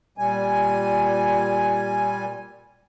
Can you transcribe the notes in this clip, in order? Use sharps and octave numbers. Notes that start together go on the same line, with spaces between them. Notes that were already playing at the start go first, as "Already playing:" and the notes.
A#2 G3 G#5